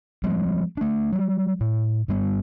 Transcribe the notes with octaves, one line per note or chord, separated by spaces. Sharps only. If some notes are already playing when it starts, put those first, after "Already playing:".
F3 G3 G#3 C4
A3 D4
F#3 G3
A2
G2 G3 B3